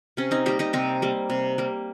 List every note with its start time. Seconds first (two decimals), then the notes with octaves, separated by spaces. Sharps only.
0.17 C3 C#4
0.31 C4 D#4
0.46 G3 A#3 D#4 G4
0.59 D#4 G4
0.73 C3 C4 D#4
1.02 G3 A#3
1.30 C3
1.58 G3 A#3